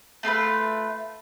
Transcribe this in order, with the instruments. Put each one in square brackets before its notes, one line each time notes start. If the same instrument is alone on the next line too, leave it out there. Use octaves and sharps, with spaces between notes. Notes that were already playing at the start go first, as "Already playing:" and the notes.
[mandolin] A3 F4 A4 B4